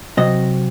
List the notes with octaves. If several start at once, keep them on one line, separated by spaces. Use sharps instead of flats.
C3 F#3 C4 D#5